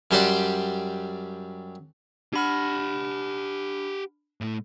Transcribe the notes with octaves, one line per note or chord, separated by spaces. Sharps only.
F#2 G3 G4 C5 D5 F#5
D4 G4 F#5 B5 F6
A2 A3